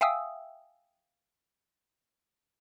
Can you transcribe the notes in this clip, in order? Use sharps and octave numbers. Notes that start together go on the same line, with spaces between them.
E5 F5 G5 G#5 D#6 E6